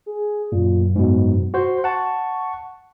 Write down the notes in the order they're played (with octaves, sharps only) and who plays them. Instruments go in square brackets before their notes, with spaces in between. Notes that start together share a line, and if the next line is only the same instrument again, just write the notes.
[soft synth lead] G#4
[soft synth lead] F#2 [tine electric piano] A#2
[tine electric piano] G#2 B2
[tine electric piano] F#4 C5 [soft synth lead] C6
[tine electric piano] F#5 A5 [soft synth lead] C#6